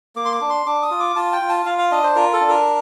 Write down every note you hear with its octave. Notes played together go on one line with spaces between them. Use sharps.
A#3 D6
C6
D6
D4
C6
D4 D6
D#6
F4
D6
F4 A5
G5
F4
A5
F4 F5
F5
D4 D#5
C5
F4 A#4
A4
D4
A#4